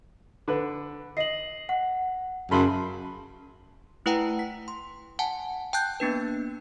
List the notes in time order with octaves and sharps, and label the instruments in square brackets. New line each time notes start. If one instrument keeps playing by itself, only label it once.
[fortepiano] D3 B4
[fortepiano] D#5 [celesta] C7 F#7
[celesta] F#5
[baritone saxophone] F#2 [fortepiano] C#3 B5 C6 [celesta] A5
[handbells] A3 E4 B4 F#5 G5 A#5
B6
C6
F#5 G#5 A5
G5 A5 F#6 G6
A#3 B3 D4 B4